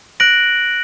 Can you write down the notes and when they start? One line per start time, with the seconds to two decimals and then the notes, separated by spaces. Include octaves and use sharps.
0.20 F#6 A#6 D7 F#7